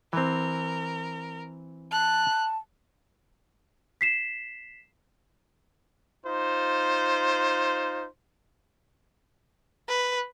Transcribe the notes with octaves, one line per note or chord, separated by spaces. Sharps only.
E3 C4 A#4
A5 F#6
B6 C7 E7
D#4 F4 C5
B4